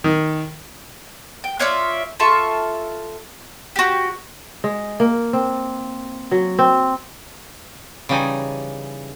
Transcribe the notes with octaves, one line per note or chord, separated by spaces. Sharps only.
D#3
G5
F4 C#5 D5 E5
F4 A4 E5 C#6
F#4 G4
G#3
A#3
C4
F#3
C4
C#3 E3 G3 D#4 G#5